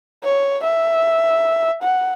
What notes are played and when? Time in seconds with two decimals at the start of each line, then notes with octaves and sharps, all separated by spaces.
0.24 C#5
0.64 E5
1.83 F#5